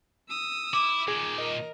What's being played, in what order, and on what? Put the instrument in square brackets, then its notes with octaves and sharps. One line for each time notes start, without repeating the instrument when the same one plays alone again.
[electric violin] D#6 E6
[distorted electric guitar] E4 [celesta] D6
[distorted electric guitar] A#2 D#3 [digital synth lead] G#4
[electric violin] A#4 [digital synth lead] D#5